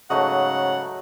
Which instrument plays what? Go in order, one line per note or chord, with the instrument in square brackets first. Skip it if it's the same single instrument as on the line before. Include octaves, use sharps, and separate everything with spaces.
[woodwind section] G#2 C#3 [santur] F#3 A3 D#5 [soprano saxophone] F#5